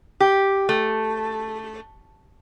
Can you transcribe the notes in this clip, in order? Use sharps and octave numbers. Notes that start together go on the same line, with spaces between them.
G4
A3